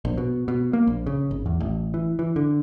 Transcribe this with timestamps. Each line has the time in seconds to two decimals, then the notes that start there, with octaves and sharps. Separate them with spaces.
0.05 A#1
0.18 B2
0.48 B2
0.73 A#3
0.87 A#1
1.07 C#3
1.31 G#1
1.46 E2
1.60 A1
1.94 E3
2.19 E3
2.36 D3